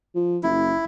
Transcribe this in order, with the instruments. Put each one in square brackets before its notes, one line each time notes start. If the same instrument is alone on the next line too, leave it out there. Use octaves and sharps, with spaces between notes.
[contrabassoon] F3
[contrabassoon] F#1 [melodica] E4